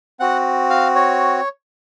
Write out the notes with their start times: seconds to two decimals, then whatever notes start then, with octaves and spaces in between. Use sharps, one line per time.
0.20 C4 F#4 F#5
0.70 F5
0.95 C#5